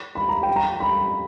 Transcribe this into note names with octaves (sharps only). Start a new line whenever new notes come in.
B5
A#5
G5
A#5
B5